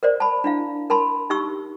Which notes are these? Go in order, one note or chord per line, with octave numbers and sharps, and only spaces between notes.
A#4 C5 D5
A5 B5
D4 E4 F5
A#4 A5 B5 C6
D#4 G4 C#6 E6